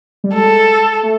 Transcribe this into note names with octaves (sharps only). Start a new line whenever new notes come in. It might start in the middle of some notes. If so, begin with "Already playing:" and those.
G3
G#3 A4
A3